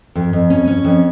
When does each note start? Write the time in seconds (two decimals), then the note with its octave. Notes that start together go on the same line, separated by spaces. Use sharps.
0.15 F2
0.33 F2
0.50 C#4
0.68 C#4
0.85 F2